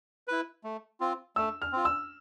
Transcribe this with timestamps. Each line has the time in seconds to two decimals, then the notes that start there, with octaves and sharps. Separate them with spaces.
0.28 E4 B4
0.64 A3
1.00 C4 F4
1.36 A3 E6
1.62 F6
1.72 C4 F4
1.85 E6